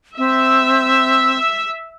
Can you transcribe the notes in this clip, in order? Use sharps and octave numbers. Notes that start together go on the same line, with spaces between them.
C4 E5